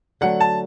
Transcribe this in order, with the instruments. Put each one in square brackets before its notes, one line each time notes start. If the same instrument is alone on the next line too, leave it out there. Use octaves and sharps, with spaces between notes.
[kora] D3 F#3 A3 [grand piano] F#5
[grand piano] A5